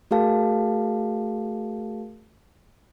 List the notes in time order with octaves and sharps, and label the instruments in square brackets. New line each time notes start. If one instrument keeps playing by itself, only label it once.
[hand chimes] A3 F#4 G#4 A#4 F5 A5